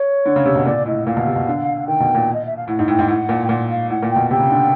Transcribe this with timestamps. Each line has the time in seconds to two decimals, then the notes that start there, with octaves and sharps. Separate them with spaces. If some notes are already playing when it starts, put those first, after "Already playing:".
Already playing: C#5
0.26 D3
0.36 C#3
0.45 C3
0.56 B2
0.66 A#2 D5
0.86 A2 D#5
1.07 A#2 F5
1.17 B2
1.26 C3
1.36 B2
1.47 D3
1.87 D#3 G5
2.00 B2
2.15 A#2
2.34 D#5
2.46 E5
2.56 F5
2.68 A2 F#5
2.79 G#2
2.88 A2 G5
2.99 G#2
3.08 A2 F#5
3.29 A#2
3.45 G5
3.49 A#2 F#5
3.70 F5
3.90 A2 F#5
4.03 A#2
4.10 G5
4.16 B2
4.30 C3 G5
4.40 C#3
4.50 D3